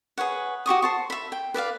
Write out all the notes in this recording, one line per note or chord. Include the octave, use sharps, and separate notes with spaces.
G#4 B4 C#5 F#5
F#4 G4 C#6 D#6
C5 A5 C#6
E5 B5
G5
B4 D5 E5 F5